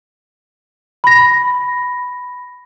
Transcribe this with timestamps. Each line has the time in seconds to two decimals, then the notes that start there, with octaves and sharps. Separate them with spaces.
1.04 B5 A#6